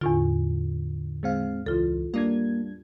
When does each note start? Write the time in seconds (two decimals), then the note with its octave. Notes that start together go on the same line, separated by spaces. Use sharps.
0.01 E2 A2 D3 F4
1.23 G#3 C4 F5
1.66 C#2 E3 F4 A4
2.14 G3 A#3 D4 G#6